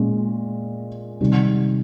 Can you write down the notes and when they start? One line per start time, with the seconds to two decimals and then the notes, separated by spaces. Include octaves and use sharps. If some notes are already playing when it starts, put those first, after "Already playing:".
Already playing: A#2 G#3 C#4
1.21 C3 D#3 G3